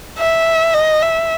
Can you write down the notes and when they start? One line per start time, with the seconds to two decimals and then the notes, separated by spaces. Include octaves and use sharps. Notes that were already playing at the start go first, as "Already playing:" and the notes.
0.18 E5
0.74 D#5
1.03 E5